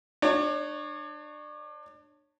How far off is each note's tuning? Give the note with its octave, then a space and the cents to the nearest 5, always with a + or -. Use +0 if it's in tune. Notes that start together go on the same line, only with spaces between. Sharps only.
D4 +30 C#5 -5